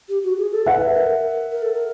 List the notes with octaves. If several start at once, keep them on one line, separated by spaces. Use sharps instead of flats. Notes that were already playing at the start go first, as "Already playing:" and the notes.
G4
F#4
G#4
A4
B4 E5 F#5
A#4
A#4
A4
A#4